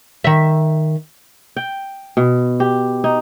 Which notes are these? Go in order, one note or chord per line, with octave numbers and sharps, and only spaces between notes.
D#3 E5
G5
B2
G4
D#4